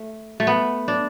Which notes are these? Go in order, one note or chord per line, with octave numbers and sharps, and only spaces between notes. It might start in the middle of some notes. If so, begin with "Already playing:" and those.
Already playing: A3
A3
B3
D4